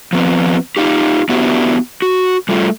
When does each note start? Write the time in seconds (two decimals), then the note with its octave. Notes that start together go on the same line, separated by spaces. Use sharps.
0.13 F3 B3 C4
0.77 D#4 F4 G4
1.29 B3 D4 E4 F#4 G4
2.02 F#4
2.49 G3 A3 F4